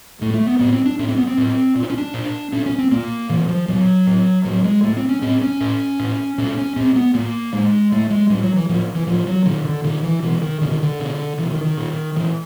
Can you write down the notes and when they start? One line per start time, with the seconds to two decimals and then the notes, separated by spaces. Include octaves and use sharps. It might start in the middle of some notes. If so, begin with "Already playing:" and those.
0.21 A2 A3
0.34 A3
0.47 B3
0.59 A2 B3
0.73 C4
0.85 D4
0.99 A2 C#4
1.08 C4
1.18 B3
1.27 C4
1.37 A2
1.75 A#2
1.83 D4
1.90 C#4
1.97 D4
2.14 A#2
2.52 A#2 C#4
2.66 C#4
2.78 C4
2.91 A#2 A#3
3.29 A#2 E3
3.49 F3
3.68 A#2 F#3
4.07 A2
4.45 A2 F#3
4.64 G#3
4.83 A2 A3
4.97 C4
5.09 C#4
5.22 A2 C4
5.42 C#4
5.60 A2
5.99 A2
6.38 A#2 C#4
6.58 C#4
6.76 A#2 C4
6.96 B3
7.14 A2 A#3
7.53 A2 G#3
7.92 A2 A3
8.10 G#3
8.30 A2 G3
8.43 F#3
8.56 E3
8.69 A2 F3
8.95 E3
9.07 A2 F3
9.27 F#3
9.45 A#2 D#3
9.65 D3
9.84 A#2 D#3
10.03 E3
10.23 B2 E3
10.42 D#3
10.61 B2 D3
10.71 D#3
10.82 D3
10.99 B2
11.38 B2 E3
11.51 D#3
11.64 D#3
11.77 A#2
12.15 A#2 E3